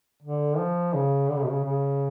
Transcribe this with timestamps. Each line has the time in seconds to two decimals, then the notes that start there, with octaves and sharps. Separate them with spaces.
0.22 D3
0.57 F3
0.94 C#3
1.28 D3
1.36 C#3
1.43 B2
1.50 C#3
1.64 C#3